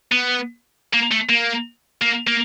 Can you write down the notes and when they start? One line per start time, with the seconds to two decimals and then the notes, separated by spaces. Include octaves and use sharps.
0.12 B3
0.93 A#3
1.11 A3
1.29 A#3
2.02 A#3
2.27 A#3